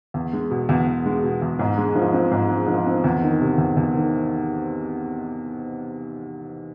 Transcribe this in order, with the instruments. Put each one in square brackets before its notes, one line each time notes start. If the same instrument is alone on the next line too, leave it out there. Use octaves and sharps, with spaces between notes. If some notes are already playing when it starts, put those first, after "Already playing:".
[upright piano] E2
G#3
B2
E2
E2
G#3
B2
E2
G#2
G#3
F3
C4
G#2
G#3
F3
C4
E2
D#3
C3
E2
E2
D#3